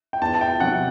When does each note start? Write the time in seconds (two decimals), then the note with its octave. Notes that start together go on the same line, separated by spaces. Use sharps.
0.13 G5
0.22 E2 A5
0.35 A5
0.41 G5
0.60 C3 F#3 F#5